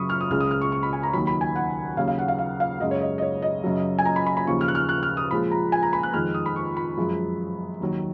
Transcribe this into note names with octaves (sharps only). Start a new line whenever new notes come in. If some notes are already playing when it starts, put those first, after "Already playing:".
Already playing: F#2 C#3 F#3 B5 C#6 D#6
F6
D#6
C#2 C#3 G#3 F6
D#6
F6
C#6
C#6
B5
G#5
A#5
D#2 D#3 F#3 B5
B5
G#5
F#5
D#2 C#3 F#3 F5
F5
F#5
F5
F5
F5
F#2 C#3 G#3 D#5
C#5
D#5
D#5
C#5
D#5
F#2 C#3 F#3
G#5
A#5
B5
B5
B5
D#2 C#3 F3 C#6
F6
F#6
F6
F#6
F6
D#6
A#2 F3 G#3 B5
A#5
G#5
A#5
B5
F#6
F2 D#3 G#3 F6
D#6
B5
C#6
B5
F#2 F3 G#3
D#2 D#3 F#3